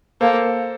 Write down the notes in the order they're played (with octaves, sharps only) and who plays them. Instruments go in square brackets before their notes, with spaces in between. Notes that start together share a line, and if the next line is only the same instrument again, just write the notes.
[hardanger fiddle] A#3 [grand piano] A4 C5